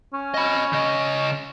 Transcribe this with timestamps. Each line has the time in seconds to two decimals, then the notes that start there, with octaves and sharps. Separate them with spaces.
0.14 C#4
0.34 D#5 B5
0.73 C#3 D#5